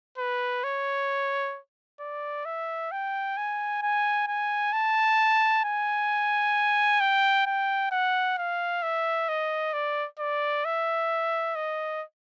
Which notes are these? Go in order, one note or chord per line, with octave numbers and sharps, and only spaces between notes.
B4
C#5
D5
E5
G5
G#5
G#5
G#5
A5
G#5
G5
G5
F#5
F5
E5
D#5
D5
D5
E5
D#5